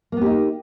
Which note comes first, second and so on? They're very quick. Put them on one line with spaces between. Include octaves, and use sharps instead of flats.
A#3 B3 G4 D#4